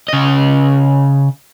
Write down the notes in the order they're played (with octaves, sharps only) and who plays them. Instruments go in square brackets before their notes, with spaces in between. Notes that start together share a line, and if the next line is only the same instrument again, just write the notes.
[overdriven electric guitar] C#3 D#5